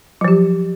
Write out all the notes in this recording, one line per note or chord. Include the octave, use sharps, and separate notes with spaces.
F3 F#3 G4